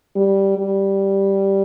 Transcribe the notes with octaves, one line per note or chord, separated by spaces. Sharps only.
G3
G3